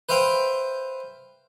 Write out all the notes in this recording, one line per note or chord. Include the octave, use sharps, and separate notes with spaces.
B4 C5 E5 F5 G5